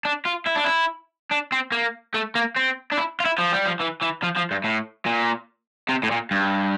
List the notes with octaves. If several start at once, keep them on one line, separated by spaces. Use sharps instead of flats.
D4
F4
E4
D4
E4
D4
C4
A#3
A3
A#3
C4
D4
E4
F4
E4
F3
G3
F3
E3
E3
F3
F3
G2
A2
A#2
C3
A2
A#2
G2